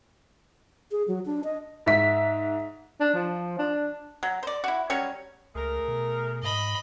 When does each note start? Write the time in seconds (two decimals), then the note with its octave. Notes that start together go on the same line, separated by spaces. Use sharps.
0.91 G#4
1.08 F#3
1.26 D4
1.44 D#5
1.86 G#2 E5 B6
3.00 D4
3.14 F3
3.59 D4
4.23 F#3
4.43 C5 D5
4.64 E4 F#4
4.90 F#3 G3 C#4 C#5
5.55 C#2 A3 G#4 A#4
5.88 B2
6.43 G#2 D#5 B5